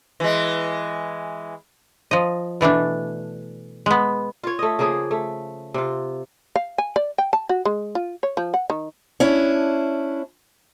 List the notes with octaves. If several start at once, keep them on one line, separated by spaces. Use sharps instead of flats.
E3 G#3
F3 D#5
B2 E3 A3 D4
G#3 B3
F4 C#5
A3 D#5
C#3 F3 A#3 G#4
A3
C3 F4
F5
G#5
D5
G5
A5
F#4
G#3
F4
C#5
F3
F#5
D#3
C#4 D4 E4